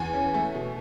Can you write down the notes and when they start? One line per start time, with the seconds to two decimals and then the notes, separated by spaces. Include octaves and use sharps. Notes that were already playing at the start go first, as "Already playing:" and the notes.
Already playing: E2 G#5
0.14 C#4
0.34 A3
0.55 B2